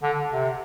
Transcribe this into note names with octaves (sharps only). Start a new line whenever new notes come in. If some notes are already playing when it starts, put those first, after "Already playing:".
D3
C3